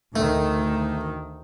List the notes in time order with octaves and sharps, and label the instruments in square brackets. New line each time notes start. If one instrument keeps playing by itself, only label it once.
[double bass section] D2 D#3 [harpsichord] A3